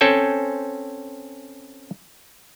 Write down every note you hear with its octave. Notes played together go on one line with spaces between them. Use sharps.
C4 C#4 A4 G5 G#5